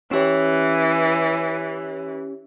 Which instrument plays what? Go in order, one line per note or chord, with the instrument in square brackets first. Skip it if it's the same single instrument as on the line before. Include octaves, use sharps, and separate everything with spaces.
[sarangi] E3 [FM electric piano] C#4 G4 C#5